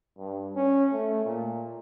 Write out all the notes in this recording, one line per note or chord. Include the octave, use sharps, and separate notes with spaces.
G2
C#4
A3
A#2